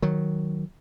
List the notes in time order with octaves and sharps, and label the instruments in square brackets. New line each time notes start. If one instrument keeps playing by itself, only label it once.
[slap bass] D#3 F#3